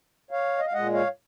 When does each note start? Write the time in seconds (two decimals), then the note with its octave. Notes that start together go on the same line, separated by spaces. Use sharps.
0.31 C#5 F5
0.58 D#5
0.66 F5
0.73 A#2 G#3 D#5 F#5
0.93 C#5 F5